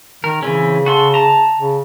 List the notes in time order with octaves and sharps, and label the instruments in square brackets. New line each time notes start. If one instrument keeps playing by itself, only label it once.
[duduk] D#3 [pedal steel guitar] A#4
[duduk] C#3 [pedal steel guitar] E3 C4 C#4
[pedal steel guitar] F#4 A4 C6
A5 A#5
[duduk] C#3